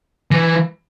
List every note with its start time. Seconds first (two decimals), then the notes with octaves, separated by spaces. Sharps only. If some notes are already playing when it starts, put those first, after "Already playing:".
0.31 E3